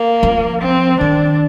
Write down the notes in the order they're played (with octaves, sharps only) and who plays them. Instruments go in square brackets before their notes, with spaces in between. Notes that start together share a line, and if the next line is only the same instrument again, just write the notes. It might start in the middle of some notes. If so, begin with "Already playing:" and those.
Already playing: [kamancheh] A#3
[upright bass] F3
[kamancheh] C4
[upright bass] D#3 [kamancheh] D4